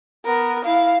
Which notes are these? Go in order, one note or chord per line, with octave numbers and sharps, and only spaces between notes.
B3 A#4
E4 F5